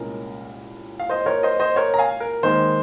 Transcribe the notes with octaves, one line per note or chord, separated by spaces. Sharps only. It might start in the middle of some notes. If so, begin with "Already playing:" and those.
Already playing: C2 A#2 G#3 C#4 A#4
F5
C5 D#5
A#4 C#5
C5 D#5
C5 D#5
A#4 C#5
A#5
F5 G#5
A#4
D#2 D#3 G#3 C5